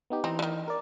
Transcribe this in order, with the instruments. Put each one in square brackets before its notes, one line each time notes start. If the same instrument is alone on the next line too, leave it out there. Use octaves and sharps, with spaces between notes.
[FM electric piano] B3 D#4 G4
[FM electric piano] E3 [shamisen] C4 D#4
[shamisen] D3 D#3
[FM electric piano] A#4 D5